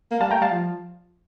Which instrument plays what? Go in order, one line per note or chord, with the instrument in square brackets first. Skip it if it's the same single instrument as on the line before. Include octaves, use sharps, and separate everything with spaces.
[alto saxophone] A#3
[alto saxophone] G3 [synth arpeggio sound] F5 A5
[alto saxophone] A3 [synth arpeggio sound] G5 A#5
[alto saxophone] G3 [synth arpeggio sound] F5 A5
[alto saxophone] F3